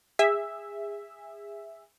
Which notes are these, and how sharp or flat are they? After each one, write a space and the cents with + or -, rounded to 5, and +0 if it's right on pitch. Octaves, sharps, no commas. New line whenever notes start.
G#4 -25 E5 +0